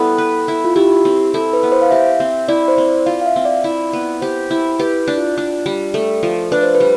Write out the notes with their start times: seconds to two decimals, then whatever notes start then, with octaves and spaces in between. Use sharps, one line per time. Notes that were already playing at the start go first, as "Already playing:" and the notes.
Already playing: G3 B3 E4 A4
0.18 B4
0.48 E4
0.65 F4
0.76 E4 G4
1.05 C4
1.34 E4 A4
1.53 B4
1.63 B3
1.72 C5
1.82 F5
1.91 G4 E5
2.20 C4
2.48 E4 D5
2.68 C5
2.78 C4
2.87 D5
3.06 F4 F5
3.22 F5
3.26 E5
3.36 C4
3.45 D5
3.64 E4
3.93 B3
4.22 G4 C5
4.51 E4
4.79 G4 B4
5.08 D4
5.18 F4
5.38 D4
5.66 G3
5.94 A3 A4
6.23 F3
6.52 D4 B4
6.63 C5
6.75 B4
6.80 G3